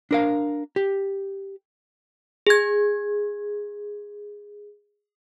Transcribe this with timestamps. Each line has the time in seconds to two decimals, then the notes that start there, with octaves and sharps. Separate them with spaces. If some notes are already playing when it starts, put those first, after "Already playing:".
0.11 D4 A#4 F5
0.76 G4
2.47 G#4 G#6